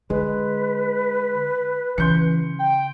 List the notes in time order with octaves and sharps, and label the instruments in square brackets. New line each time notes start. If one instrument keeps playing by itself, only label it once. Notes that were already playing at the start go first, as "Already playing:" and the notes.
[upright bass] D3 [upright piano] G#3 [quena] B4
[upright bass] C#3 [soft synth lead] E3 [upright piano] C6 G6 C#7
[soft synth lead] G5